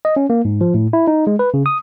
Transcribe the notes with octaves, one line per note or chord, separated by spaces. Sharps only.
D#5
C#4
A#3
G#2
F3
A2
E4
D#4
G#3
B4
C#3
D#6